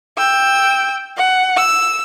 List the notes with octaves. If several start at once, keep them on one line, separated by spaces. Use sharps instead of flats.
G5 E6
F#5
E6